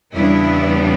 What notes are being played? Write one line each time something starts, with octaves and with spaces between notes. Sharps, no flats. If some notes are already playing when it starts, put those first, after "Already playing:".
E2 C#3 G3 B3 D4 E4